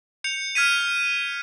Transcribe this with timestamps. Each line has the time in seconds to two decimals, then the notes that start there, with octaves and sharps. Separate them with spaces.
0.24 G6 C#7 F7
0.55 F6 G#6 B6 D#7